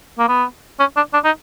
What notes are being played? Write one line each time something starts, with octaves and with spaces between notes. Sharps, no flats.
A#3
B3
C#4
D4
D4
D#4